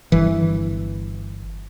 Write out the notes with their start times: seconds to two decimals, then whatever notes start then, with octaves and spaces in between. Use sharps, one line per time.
0.12 G1 E3